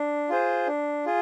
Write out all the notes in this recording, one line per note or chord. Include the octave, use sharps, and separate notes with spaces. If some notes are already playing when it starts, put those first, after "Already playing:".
Already playing: D4
F4 G#4 C5
D4
F4 G#4